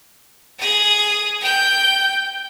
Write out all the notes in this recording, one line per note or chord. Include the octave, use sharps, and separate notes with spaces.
G#4 D#6
G5 G6